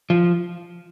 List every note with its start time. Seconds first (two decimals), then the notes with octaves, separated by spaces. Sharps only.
0.10 F3